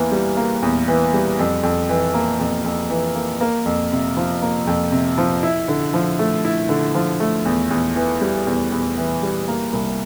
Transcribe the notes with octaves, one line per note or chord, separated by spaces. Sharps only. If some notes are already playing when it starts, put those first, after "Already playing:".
Already playing: E2 E3 A#3
G3
A#3
E2
E3
G3
F2
F2
E3
A#3
F2
F2
E3
A#3
A#3
F2
C3
F3
A#3
F2
C3
F3
E4
D3
F3
A3
E4
D3
F3
A3
E2
E2
E3
G3
E2
E2
E3
G3
A#3
C2